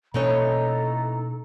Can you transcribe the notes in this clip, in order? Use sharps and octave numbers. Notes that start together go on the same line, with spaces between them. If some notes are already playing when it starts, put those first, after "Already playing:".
B2 E3 A#3 C#4 D#4 A4 C#5 A#5